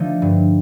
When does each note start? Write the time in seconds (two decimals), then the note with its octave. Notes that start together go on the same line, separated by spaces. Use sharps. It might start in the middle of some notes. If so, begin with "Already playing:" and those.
Already playing: D3 F3 A3 D#4
0.22 G2